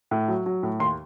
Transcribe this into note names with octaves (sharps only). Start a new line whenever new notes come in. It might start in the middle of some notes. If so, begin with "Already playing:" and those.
A2
F#3
F#3
A2
D#2 C6